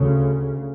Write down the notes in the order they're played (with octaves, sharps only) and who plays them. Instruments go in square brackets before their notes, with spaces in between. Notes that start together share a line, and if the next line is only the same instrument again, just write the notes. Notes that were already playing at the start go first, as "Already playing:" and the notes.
Already playing: [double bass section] D2 C#3